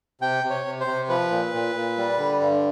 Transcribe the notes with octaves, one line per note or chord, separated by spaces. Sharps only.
C3 G5
C3
C#5
C3
C5
C3
F3 B4
A#2
A#2
A#2
G3
D3
G2